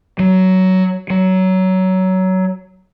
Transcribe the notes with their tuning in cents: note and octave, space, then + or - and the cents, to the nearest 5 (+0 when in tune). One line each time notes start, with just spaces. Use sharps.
F#3 +15
F#3 +20